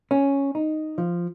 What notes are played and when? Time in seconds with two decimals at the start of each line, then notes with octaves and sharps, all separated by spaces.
0.11 C#4
0.55 D#4
0.98 F3